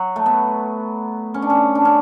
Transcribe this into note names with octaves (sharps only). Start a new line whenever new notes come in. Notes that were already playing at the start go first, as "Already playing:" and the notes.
Already playing: F#3
A3
B3
C#4
D4
C#4
D4
C#4